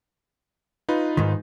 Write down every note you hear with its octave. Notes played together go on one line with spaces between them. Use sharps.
D#4 F4 B4
G#2 D#3